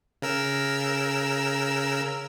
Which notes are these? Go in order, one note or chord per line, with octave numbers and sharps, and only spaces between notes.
C#3 A#4 E6